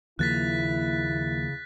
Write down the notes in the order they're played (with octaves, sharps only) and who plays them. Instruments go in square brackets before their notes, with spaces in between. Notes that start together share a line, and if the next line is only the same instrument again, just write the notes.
[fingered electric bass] D#2 F3 A#3 [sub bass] C#3 [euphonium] E4 [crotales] F#6 A6 B6